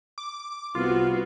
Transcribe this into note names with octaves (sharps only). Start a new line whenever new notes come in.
D6
C2 B3 F4 F#4